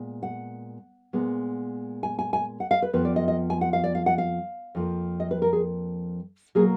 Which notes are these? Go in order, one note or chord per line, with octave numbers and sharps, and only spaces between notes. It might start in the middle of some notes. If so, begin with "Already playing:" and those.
Already playing: A#2 G#3 B3
F#5
A#2 G#3 B3
G#5
G#5
G#5
F#5
F5
B4
F2 F3 B3 B4
D5
D#5
D#5
G#5
F#5
F5
D5
F5
F#5
F5
F2 F3 A#3
D#5
B4
A#4
G#4
B2 F#3 A#3 G#4